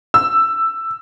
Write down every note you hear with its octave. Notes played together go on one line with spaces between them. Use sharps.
E6